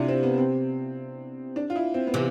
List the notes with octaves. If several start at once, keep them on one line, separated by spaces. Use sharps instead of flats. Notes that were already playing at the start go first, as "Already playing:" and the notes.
Already playing: C3 D4 E4 F4
C4
B3
C4
D4
F4
E4
C4
B3
C3 E3